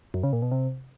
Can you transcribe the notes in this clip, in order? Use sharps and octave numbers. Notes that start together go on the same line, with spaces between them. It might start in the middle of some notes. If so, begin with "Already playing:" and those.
F#2
C#3
A#2
B2
C3